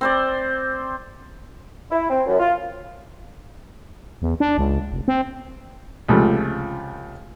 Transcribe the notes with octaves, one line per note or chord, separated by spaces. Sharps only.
C4 C5 D5
E4
C4
F#2
F4
E2
D4
C#2
F1
C4
C#2 C3 F3 A3